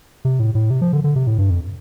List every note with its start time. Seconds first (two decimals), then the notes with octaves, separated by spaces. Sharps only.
0.25 C3
0.40 A2
0.55 A2
0.70 C3
0.81 F3
0.93 D3
1.04 D3
1.16 C3
1.27 A2
1.38 G2
1.50 F2